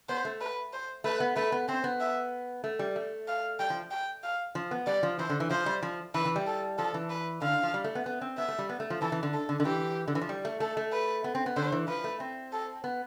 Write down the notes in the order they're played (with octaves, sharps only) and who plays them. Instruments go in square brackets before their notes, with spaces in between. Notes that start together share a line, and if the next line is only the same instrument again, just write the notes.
[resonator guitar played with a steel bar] B3 [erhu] C5
[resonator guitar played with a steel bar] A3
[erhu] B4
C5
[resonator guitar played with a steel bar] A3 [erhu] B4
[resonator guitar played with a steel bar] B3
[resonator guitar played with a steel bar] A3 [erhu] B4
[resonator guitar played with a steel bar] B3
[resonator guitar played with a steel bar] C4 [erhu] C5
[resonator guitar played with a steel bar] B3
[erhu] E5
[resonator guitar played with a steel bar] A3
G3
A3
[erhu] F5
[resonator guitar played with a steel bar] G3 [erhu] G5
[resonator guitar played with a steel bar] F3
[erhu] G5
F5
[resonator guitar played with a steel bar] F3
B3
[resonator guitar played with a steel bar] G3 [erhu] D5
[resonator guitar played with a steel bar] F3
[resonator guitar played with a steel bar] E3 [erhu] C5
[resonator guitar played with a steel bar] D3
E3
[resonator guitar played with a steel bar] F3 [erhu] C5
[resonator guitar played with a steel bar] G3
F3
[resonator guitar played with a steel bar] E3 [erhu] B4
[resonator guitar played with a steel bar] E3
G3
[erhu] A4
[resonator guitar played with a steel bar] F3 [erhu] A4
[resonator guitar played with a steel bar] E3
[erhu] B4
[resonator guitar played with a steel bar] D3 [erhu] F5
[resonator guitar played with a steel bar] F3
G3
A3
B3
B3
C4
[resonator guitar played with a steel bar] B3 [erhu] E5
[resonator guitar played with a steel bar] A3
G3
B3
A3
F3
[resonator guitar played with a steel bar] E3 [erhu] A4
[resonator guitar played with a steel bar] E3
D3
[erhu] A4
[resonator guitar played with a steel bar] D3
D3
[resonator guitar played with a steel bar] E3 [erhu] G4
[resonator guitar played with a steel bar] D3
E3
F3
G3
A3
[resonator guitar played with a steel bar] A3 [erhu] A4
[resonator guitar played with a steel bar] A3
[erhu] B4
[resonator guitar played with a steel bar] B3
C4
B3
[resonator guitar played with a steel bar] D3 [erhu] C5
[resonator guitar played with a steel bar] E3
[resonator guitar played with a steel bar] F3 [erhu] B4
[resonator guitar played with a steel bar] A3
C4
[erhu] A4
[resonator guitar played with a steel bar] B3